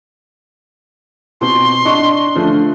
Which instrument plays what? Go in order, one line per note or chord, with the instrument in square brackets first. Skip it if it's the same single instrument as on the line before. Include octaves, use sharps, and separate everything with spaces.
[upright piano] B2 C4 [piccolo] C6
[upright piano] D4 D#5 C#6
D3 F3 A3